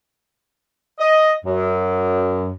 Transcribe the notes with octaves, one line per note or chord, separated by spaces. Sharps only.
D#5
F#2